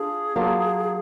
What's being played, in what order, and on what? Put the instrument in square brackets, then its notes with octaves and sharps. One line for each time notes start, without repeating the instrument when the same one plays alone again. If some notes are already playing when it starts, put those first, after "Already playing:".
Already playing: [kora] D4 F4 [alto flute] G#4
[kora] F#3 A#3 D4 F4